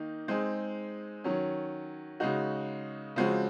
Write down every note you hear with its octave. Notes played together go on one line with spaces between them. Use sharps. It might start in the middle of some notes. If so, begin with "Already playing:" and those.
Already playing: D#3 A#3 D#4
G#3 C4 D#4 G#4
D#3 F#3 C#4
C#3 G#3 D#4 F#4
C#3 F3 G#3 C4 F#4